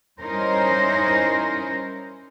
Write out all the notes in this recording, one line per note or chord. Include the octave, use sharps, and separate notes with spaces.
G3 C#4 D#4 E4 A#4 C5